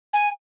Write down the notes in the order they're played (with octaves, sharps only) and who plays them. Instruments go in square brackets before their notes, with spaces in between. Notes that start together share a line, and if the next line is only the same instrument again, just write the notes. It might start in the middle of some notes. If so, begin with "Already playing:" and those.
[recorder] G#5